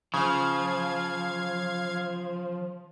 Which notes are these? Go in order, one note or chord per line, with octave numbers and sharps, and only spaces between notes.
C#3 F3 F5 G#6